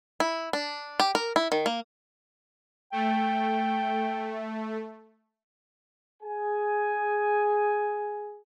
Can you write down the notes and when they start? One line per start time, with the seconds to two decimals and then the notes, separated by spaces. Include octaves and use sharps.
0.20 E4
0.53 D4
1.00 G4
1.15 A#4
1.36 E4
1.52 D#3
1.66 A#3
2.92 A3 G5
6.23 G#4 G#5